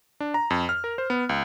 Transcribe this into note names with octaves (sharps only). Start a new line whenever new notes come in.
D4
A#5
F2
F6
A#4
C5
B3
C#2